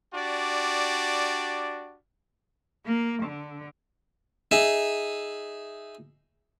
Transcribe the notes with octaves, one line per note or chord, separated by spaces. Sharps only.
D4 F#4 G4 D5
A#3
D3
D#4 G#4 E5